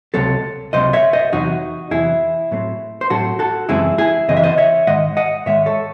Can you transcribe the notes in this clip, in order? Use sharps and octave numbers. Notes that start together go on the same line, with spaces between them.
C#2 C3 F#3 C4 A4 C#5
C#2 C3 F#3 C4 C5 D#5
C#5 E5
C5 D#5
E2 C3 F#3 D#4 F#4
E2 C3 F#3 E4 G#4
A2 F#3 A3 C4
C5
A2 F#3 A3 C4 F#4 A4
F#4 A4
F#2 C#3 E3 G#3 C4 E4 G#4
E4 G#4
F#2 C#3 E3 C4 D#5
E5
C5 D#5
C#5 E5
G#2 D#3 G#3 D#5 F#5
D#5 F#5
G#2 D#3 G#3 C#5 E5
A4 C#5